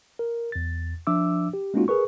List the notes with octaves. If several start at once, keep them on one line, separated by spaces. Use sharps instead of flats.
A#4
E2 A6
F3 D4 E5 D6 E6
G4
G#3 A#3 C#4 D#4 F4 F#4
G#4 A#4 B4 C#6